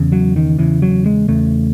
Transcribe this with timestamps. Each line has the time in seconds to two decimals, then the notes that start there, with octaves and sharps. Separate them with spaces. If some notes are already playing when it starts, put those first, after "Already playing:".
Already playing: E2 C#3
0.12 F#3
0.36 D#3
0.58 E2 C#3 E3
0.82 F#3
1.06 G#3
1.28 E2 C#3 A3